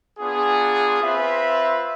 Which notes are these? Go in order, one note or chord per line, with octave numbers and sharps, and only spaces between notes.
B3 D4 F4 G#4
C4 F4 B4 E5